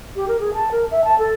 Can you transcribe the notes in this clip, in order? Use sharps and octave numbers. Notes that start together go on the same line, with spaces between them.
G4
A#4
G#4
A5
A#4
E5
A5
A4